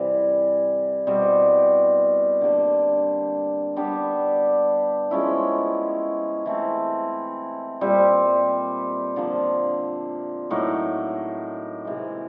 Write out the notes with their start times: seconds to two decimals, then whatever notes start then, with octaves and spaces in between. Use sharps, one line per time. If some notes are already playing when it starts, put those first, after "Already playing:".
Already playing: C3 E3 G3
1.07 B2 G3 C4
2.41 D3 G3 A#3 D4
3.76 G3 B3 D4 G4
5.11 F3 G#3 C#4 E4
6.46 E3 A3 C4
7.81 A#2 G3 C4
9.16 D3 F3 A#3
10.50 A2 F#3 A#3 D#4
11.85 C3 E3 G#3